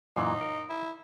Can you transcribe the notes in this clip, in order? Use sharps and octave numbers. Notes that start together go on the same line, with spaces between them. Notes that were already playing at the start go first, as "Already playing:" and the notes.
F#2 A#2 E3 D#4
A#4
E4